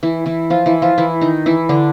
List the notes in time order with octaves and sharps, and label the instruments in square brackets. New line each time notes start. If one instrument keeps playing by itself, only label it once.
[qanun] E3 E4
E3 E4
F3 F4
E3 E4
F3 F4
E3 E4
D#3 D#4
E3 E4
D3 D4